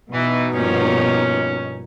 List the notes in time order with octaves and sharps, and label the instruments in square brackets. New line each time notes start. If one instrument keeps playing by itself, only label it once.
[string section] B2 D#4 [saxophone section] E3
[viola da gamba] G2 F3 A#3 [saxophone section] C#4